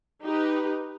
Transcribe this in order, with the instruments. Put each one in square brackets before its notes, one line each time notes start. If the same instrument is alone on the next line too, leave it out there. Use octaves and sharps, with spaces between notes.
[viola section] D#4 G4 B4